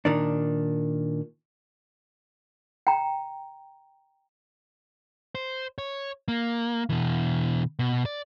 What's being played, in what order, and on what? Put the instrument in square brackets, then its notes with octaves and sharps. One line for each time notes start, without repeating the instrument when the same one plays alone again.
[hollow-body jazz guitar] A#2 D#3 D4
[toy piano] G5 A#5
[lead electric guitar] C5
C#5
A#3
B2 E3
B2
D5